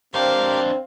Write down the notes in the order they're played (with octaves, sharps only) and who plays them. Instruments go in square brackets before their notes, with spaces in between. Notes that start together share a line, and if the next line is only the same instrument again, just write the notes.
[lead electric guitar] F2 D4 [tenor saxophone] C4 [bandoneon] G4 A#4 C5 [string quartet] F5